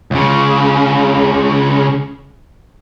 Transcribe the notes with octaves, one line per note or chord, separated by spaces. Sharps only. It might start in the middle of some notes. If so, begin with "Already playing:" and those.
C#2 C#3